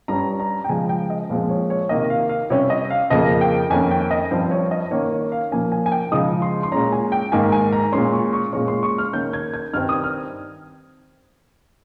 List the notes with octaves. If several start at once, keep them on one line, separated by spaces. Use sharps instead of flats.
G2 G3 C#4 A#5
A#5
G5
C#3 F3 G#3 G#5
G5
D#5
A#2 F3 G#3 C4 C5
C#5
C#5
C3 D#3 A#3 D#5
F5
F5
C3 G3 C#4 C#5
D#5
F5
F2 C#3 F3 A#3 D#5
G5
F2 D#3 A#3 C#4 G#5
G5
D#5
G2 F3 C4 C5
C#5
D#5
D#3 A#3 C#4 C#5
C#5
F5
A#2 F3 A#3 C#4 G#5
G#5
G#5
G5
C#3 F3 G#3 D#4 D#6
C6
C6
A#2 G#3 C#4 A#5
G#5
G5
G#2 D#3 A#3 G#5
G#5
A#5
A#2 G#3 C#4 C6
C#6
C#6
A#2 G#3 C#4 C#6
C6
C#6
F6
D#3 A#3 C#4 G6
G#6
G#6
G2 D#3 G3 C4 F6
D#6
F6